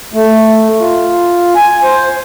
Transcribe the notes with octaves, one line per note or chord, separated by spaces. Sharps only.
A3
F4
G#5
C5